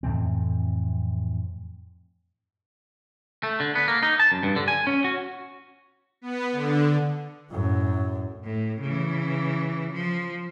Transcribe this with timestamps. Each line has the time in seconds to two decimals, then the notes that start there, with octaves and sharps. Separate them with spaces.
0.03 F2 A2 E3 C4
3.43 A3
3.60 D3
3.75 B3
3.88 A#3
4.03 D#4
4.20 A5
4.32 F#2
4.43 G2
4.56 D3
4.68 G#5
4.87 C#4
5.04 F#4
6.21 B3
6.52 D3
7.51 F#2 A2
8.44 A2
8.81 C#3 E3
9.92 F3